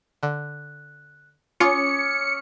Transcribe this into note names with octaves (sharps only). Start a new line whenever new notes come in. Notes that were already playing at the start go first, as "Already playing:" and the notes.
D3 F#6
C#4 F4 C#5 D6 D#6 C#7